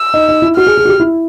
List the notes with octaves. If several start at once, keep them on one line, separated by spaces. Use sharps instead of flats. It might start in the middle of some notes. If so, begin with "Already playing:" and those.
Already playing: E6
D#4
D#4
E4
F#4 F6
G#4
G#4
F#4
G4
E4